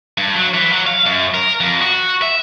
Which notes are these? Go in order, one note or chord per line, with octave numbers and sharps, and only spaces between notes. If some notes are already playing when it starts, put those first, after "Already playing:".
G2
F#3
E3
F#3
F5
F#2
A#4
F2
F#4
E5